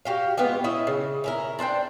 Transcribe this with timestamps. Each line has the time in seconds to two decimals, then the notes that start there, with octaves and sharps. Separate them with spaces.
0.05 F#4 G4 F5
0.38 G#3 B3 F4 G4
0.64 C#4 E4 D#5 E5
0.87 C#3
1.24 C#4 E4 A#4
1.59 D4 C5 F#5 G5